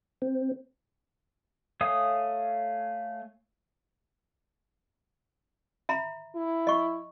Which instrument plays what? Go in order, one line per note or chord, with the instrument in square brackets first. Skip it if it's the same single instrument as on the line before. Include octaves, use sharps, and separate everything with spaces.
[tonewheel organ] C4
[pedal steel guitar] A3 C#5 F5 G#5 D#6
[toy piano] E5 A#5 B5
[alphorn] E4
[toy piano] D#5 C#6